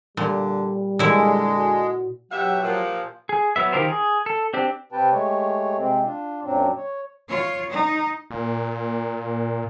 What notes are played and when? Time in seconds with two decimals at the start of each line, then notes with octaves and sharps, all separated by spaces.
0.17 A#2 D3 G3
0.99 A#2 D3 G#3 E4
1.57 F#4
2.31 B2 E3 F#3 G4 E5 F#5
2.63 A#2 F3
3.29 G#4
3.56 F#3 B3 E5
3.72 D#3 F4 G4 A#4 C5
3.88 G#4
4.26 A4
4.54 C4 D4 G4
4.92 C3 C4 G4 B4 G5 A5
5.11 G#3 A3 G4 C#5
5.77 C3 G#3 C4
6.03 D4 F4
6.43 F#2 A#2 F#3 C4 D4
6.77 C#5
7.29 F4 C#5
7.70 D#4
8.31 A#2